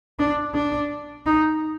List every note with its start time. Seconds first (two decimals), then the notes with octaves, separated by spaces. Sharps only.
0.19 D4
0.54 D4
1.26 D#4